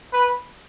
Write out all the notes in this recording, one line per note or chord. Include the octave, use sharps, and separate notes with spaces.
B4